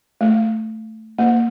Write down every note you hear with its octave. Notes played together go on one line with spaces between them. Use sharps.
A3
A#3